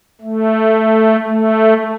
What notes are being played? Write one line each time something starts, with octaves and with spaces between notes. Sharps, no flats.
A3
A3